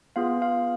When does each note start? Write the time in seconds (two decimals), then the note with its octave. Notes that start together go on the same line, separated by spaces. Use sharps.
0.16 B3 F4 G#4 F5
0.42 F5